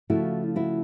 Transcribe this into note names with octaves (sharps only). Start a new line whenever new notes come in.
C#3 F3 A3 E4 F#4
E4 F#4